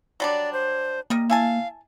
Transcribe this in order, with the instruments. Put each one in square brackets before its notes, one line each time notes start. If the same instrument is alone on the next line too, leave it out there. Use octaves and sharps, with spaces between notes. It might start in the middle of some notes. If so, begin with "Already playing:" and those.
[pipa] F#3 G3 D4 [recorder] D5
[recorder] C5
[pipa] G3 A#4 D#5 [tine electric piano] A#3
[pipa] E4 G#5 A5 [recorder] F5